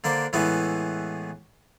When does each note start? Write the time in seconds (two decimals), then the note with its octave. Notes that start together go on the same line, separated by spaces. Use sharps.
0.04 D3 A#3 D4 C5
0.33 A2 E3 G#3 B3 E4